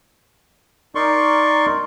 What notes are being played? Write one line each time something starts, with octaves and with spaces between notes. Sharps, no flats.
D#4 A#4 D5 C6 C#6